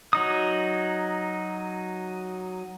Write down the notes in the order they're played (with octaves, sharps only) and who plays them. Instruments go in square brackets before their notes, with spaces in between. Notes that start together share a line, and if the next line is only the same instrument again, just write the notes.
[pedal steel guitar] F#3 D#4 D#6